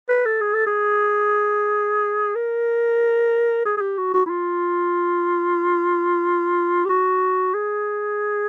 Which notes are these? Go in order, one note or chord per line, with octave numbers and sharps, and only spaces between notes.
B4
A4
G#4
A4
G#4
A#4
G#4
G#4
G4
F#4
F#4
E4
F4
G4
F#4
G#4